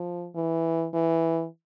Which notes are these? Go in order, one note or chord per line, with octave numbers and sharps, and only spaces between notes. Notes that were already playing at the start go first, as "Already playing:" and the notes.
Already playing: F3
E3
E3